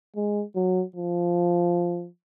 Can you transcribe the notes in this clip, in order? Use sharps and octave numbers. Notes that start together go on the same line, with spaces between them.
G#3
F#3
F3